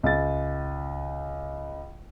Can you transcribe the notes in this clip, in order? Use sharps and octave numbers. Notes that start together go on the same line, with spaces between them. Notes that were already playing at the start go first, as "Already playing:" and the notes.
C#2 A6